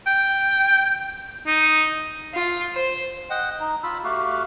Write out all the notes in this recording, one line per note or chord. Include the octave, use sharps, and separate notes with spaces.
G5
D#4
F4
C5
D#5 F#5 G5
D#4
F4 B5 E6
A3 F#4 G4 F5